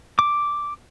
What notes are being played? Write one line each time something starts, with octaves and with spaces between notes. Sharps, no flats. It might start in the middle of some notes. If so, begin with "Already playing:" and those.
D6